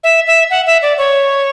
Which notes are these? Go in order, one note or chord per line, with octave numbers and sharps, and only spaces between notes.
E5
E5
F#5
E5
D5
C#5